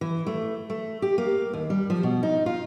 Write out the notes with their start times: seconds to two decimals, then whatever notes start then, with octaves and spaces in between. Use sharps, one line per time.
0.01 E3
0.27 A3
0.70 A3
1.02 G4
1.18 A#3
1.53 D#2
1.70 G3
1.90 F3
2.03 B2
2.23 D#4
2.46 F4